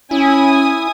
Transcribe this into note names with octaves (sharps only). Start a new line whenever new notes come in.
C#4 E4 G#5 D#6